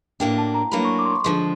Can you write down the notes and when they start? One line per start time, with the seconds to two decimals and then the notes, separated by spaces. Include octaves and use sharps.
0.20 A2 F#3 A#3 D4 G5
0.38 A5
0.54 A#5
0.71 A2 F#3 A#3 D4 B5
0.85 C#6
0.99 D6
1.05 C6
1.11 C#6
1.24 D3 F3 G#3 C6